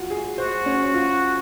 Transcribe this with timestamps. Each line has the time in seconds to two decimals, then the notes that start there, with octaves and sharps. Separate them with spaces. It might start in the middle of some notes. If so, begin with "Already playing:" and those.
Already playing: F4 F#4
0.10 G#4
0.38 F#4 C5
0.66 C#4
0.94 F4